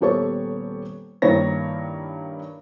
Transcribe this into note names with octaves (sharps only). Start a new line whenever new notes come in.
D#1 B3 G4 A4 C#5 C#6
G2 D#3 A#3 E4 C#5 A#6